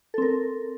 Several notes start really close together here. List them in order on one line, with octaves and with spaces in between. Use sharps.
A4 C4 A#4